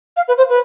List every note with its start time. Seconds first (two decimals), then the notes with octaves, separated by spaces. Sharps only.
0.16 F5
0.27 B4
0.37 C5
0.49 B4